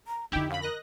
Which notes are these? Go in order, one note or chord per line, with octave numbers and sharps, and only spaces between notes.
A#5
F2 D3 D#4 E4 G4
F#2 F5 B5
A#4 D#5 F#6 A#6